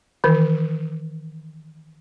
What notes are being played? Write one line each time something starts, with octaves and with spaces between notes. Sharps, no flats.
D#3 E3